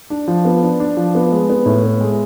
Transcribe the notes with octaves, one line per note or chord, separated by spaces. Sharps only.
D4
F3
B3
D4
D4
F3
B3
G#3
B3
A2
B3
G#3